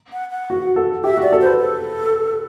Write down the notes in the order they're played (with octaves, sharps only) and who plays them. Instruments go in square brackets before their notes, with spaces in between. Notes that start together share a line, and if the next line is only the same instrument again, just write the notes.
[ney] F#5
F#5
[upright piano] F#4
A4
[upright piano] G4 [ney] E5
[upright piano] F#4
[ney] D5
[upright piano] A4
[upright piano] B4 [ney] C5
[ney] A4